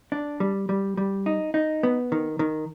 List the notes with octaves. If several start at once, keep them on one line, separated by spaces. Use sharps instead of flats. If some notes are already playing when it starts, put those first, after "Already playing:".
D4
G3
G3
G3
D#4
D#4
B3
D#3
D#3